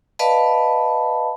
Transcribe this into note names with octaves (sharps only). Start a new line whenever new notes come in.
B4 D5 D#5 F5 A5 B5